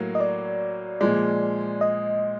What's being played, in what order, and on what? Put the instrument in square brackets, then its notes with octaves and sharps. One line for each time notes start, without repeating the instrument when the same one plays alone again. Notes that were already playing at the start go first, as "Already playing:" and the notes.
Already playing: [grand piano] A2 F#3 A#3
[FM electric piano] D#5
D5
[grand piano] A#2 F3 G#3 [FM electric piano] D5
[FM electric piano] D#5